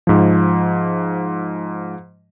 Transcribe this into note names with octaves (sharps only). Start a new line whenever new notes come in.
G#2 F3